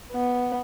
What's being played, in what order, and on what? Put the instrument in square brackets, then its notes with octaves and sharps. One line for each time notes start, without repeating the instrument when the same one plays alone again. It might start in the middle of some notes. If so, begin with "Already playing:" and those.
[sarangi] B3